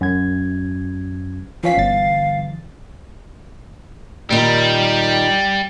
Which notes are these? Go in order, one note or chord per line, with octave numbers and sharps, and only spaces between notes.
F#2 G#6
E3 F3 C#4 F5 B6
G1 A6
A#2 D#3 G3